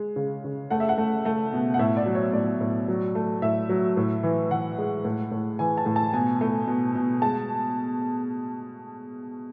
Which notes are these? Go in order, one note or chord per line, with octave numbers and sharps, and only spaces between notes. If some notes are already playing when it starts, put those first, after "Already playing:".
Already playing: G#3
C#3
C#3
A3 F#5
E5
F#5
A3
A3
B2
F#5
A2 E5
D5
F#3
C#5
A2 D5
A2
F#3
A3
A2 E5
F#3
A2
E3
E3 F#5
G#3
A2
A2
E3 G#5
A5
A2
A5
B2 G#5
A3
B2
B2
G#3 A5